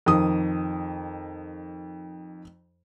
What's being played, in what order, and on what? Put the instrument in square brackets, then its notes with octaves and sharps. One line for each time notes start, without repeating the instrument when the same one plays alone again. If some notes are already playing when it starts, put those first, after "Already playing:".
[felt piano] F2 D#3 D#6